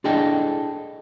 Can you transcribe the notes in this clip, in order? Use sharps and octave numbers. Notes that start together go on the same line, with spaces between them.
D4 E4 G#4 A4 D#5 G5